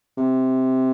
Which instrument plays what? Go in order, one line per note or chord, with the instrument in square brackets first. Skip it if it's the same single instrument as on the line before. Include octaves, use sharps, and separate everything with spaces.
[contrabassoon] C3